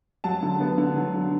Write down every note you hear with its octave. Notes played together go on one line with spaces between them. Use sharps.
F#3 A5
D3
B3
D3
F#3
D3